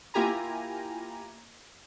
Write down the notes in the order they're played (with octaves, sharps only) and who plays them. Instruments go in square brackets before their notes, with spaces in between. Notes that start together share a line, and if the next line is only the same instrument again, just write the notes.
[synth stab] A#3 E4 F4 G4 G#5 A#5